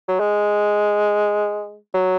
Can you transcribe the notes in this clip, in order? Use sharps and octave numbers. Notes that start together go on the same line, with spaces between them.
F#3
G#3
F#3